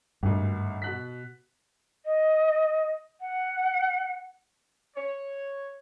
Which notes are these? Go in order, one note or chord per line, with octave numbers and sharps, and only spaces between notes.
G#1 D2 G2
B2 F#6 B6
D#5
F#5
C#5